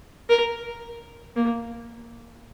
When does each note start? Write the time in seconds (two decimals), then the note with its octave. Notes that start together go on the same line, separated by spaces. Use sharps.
0.29 A#4
1.36 A#3